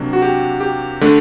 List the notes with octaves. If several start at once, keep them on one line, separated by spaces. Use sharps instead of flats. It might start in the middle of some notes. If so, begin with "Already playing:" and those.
Already playing: C3 F#3 A#3 D4 F#4
F#4
G4
G4
D3 A3 D4